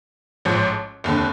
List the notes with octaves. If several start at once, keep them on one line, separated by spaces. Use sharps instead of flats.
A1 G#2 F3
F1 D#2 D3